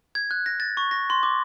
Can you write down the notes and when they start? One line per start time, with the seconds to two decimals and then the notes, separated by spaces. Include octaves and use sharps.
0.15 G#6
0.31 F#6
0.46 A#6
0.60 A6
0.77 C#6
0.91 A#6
1.10 C6
1.23 D6